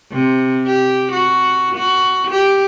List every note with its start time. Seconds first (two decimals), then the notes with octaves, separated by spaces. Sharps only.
0.12 C3
0.67 G4
1.13 F#4
1.76 F#4
2.31 G4